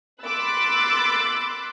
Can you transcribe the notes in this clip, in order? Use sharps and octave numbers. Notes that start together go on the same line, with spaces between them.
B5 C6 D6 E6 F#6 A6